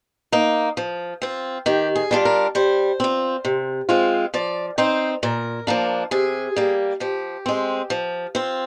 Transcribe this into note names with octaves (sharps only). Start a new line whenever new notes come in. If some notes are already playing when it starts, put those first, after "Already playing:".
A#3 D#4
F3
C4 F4
D#3 G4
G#4
G3 D4 F4
A#4
G3 C5
C4 F4
C3
F3 G#3 C4 F4
F3 D5
C4 D#4 C5
A#2 A#4
F3 A#3 D4
C3 G#4
G3 A#3
F3 G4
G#3 C4
F3
C4 F4